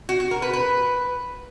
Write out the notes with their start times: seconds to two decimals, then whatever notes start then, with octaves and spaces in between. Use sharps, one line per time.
0.09 F#4
0.20 F#4
0.31 A#4
0.42 B4
0.53 B4